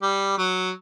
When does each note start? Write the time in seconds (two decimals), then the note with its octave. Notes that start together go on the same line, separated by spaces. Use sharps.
0.02 G3
0.38 F#3